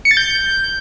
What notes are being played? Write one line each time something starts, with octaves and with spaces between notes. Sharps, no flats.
C#7
A6
G6